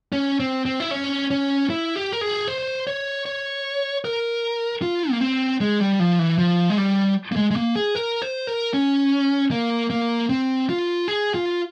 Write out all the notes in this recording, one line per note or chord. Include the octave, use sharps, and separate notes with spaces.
C#4
C4
C4
E4
C#4
C#4
E4
G4
A#4
G#4
C5
C#5
C#5
A#4
F4
A#3
C4
G#3
G3
F3
E3
F3
G#3
G3
A#3
G#3
G#3
A#3
G#4
A#4
C5
A#4
C#4
A#3
A#3
C4
F4
G#4
F4